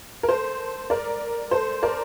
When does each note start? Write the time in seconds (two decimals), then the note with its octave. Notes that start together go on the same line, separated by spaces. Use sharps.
0.23 A#4
0.29 A4 C5
0.90 A#4 D5
1.51 A4 C5
1.83 A#4 D5